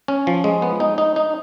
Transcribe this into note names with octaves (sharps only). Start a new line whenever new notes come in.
C#4
F3
G#3
B3
D#4
D#4
D#4